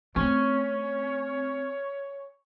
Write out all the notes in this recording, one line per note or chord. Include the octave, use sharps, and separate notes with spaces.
A3 C4 C#4 C#5 C#6